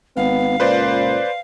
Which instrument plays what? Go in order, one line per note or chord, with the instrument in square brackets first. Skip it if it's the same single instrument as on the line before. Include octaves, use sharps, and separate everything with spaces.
[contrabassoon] G#1 [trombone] B3 [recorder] F5
[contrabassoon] C#2 [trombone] A#2 [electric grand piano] B4 C5 D5